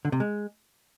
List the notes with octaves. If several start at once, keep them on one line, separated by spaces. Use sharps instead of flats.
D3
C3
G#3